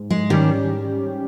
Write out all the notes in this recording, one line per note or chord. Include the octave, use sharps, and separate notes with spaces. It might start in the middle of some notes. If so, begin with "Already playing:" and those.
Already playing: G#2
G#3
D#3 G3 C#4 G4